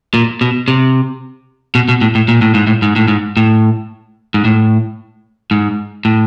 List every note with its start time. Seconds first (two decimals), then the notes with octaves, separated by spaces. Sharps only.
0.14 A#2
0.41 B2
0.68 C3
1.75 B2
1.89 B2
2.01 A2
2.15 A2
2.28 A#2
2.41 A2
2.54 G#2
2.67 A2
2.82 G#2
2.96 A2
3.08 G#2
3.37 A2
4.34 G#2
4.45 A2
5.51 G#2
6.05 A2